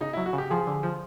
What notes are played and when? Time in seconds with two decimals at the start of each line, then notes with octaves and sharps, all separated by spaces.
0.01 C#3 D#4
0.13 E4
0.17 F#3
0.26 F#4
0.33 C#3 G4
0.50 F3 G#4
0.67 D3
0.83 F3